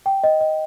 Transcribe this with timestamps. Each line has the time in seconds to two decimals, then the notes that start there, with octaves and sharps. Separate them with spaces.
0.06 G5
0.24 D#5
0.41 D#5